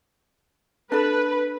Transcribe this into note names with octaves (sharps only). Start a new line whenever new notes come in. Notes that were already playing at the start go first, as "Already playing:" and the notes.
D4 A4 B4